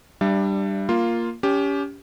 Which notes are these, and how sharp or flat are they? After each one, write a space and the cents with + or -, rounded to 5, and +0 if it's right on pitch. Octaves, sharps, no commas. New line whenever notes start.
G3 +0 D4 +15 E5 +40
A#3 +0 F4 +0
C#4 +30 G4 +5